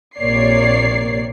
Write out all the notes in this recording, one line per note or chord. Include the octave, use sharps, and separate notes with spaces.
A#1 C3 A#3 C#5 D5 C7